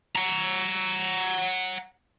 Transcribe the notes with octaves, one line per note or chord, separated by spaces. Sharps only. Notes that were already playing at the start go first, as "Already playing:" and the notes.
F#5 A#5